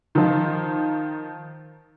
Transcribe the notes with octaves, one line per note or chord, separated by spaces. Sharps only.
D#3 F3